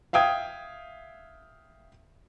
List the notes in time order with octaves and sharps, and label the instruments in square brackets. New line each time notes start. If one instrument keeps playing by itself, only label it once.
[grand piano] E5 F5 G5 D#6 G#6